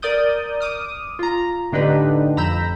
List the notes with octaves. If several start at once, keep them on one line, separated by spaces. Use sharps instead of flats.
A#4 D5 D6 D#6 G6
D6 D#6 F6
F4 A#5
A2 D3 D4 D#4 G4 B4
F2 A#5 B5 E6 G6